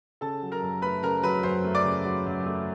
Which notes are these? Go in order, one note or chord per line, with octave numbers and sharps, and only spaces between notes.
C#3 A4 A5
F#3
A#4 A#5
F#2
A3 B4 B5
C#3 A#4 A#5
F#3 B4 B5
F#2 C5 C6
A3
D5 D6
C#3
F#3
F#2
A3